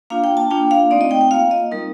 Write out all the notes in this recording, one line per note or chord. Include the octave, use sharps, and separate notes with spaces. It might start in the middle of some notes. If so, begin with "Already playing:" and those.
A#3 D4 F4 F5
G5
A5
A#3 D4 F4 G5
F5
A3 C4 D#4 D5
D#5
G5
G5
A#3 F4 F5
D#5
G3 C4 D#4 A#4